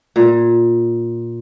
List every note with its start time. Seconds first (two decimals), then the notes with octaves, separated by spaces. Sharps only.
0.16 A#2